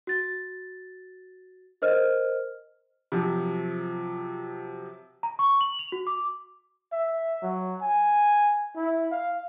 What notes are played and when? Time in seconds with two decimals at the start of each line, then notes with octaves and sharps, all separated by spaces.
0.07 F#4 A6
1.82 A#4 C5 D#5 F6
3.12 C3 F3 F#3
5.23 A#5
5.39 C#6
5.61 F#7
5.79 F7
5.92 F#4
6.07 D6
6.92 E5
7.42 F#3
7.81 G#5
8.76 E4
9.12 F5